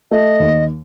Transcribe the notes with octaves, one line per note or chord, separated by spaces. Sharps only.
A3 D#5
D#2